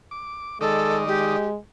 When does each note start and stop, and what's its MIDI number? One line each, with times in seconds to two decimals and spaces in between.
0.11 0.58 86
0.61 1.36 51
0.61 1.06 56
0.61 0.97 69
0.61 1.36 74
0.61 1.36 75
1.07 1.57 56
1.07 1.49 67